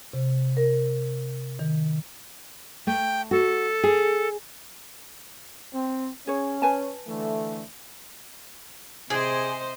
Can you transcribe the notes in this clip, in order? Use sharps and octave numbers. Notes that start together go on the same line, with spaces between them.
C3
A#4
D#3
A3 G5
F#4 A4
G#4
C4
C#4 G#4 C#5
B4 G#5 A5
D3 E3 A3
C3 G#4 C5 D5 D#5